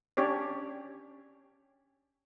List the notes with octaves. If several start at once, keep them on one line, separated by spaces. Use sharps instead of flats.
C#4 D4 G4 C#5 D5